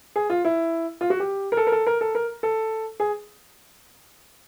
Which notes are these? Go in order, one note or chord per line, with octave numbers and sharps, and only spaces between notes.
G#4
F4
E4
F4
F#4
G4
A#4
A4
A#4
A4
A#4
A4
A#4
A4
G#4